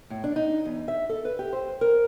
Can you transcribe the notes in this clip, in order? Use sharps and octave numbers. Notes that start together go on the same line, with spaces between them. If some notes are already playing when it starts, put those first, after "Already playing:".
A2
D4
D#4
E2
E5
A4
B4
G4
C5
A#4